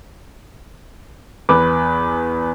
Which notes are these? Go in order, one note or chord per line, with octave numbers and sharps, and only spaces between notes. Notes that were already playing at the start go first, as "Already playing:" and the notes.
E2 B4 D6